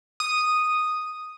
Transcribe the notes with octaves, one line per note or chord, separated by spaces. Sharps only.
D#6